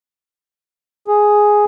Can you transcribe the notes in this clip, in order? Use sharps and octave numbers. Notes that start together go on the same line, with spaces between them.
G#4